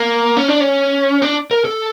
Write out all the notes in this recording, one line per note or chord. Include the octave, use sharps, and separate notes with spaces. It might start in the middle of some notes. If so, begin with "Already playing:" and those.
Already playing: A#3
C#4
D4
C#4
D4
A#4
A4